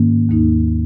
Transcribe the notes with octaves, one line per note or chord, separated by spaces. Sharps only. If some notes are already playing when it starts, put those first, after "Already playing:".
Already playing: G#2 D#3 A#3 C#4
D#2 D#3 A#3 D#4